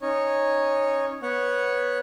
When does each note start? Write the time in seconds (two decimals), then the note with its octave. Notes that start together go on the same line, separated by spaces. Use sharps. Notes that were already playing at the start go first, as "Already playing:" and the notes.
0.02 C#4 D#4 C#5
1.22 B3 C#5 F#5